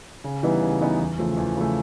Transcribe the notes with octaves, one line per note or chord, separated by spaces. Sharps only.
C#3
E3 G3 B3 D#4
C#3
E3 G3 B3 D#4
E2
C#3 F3 A3
E2
C#3 F3 A3